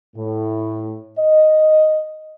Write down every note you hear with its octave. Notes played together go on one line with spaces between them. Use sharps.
A2
D#5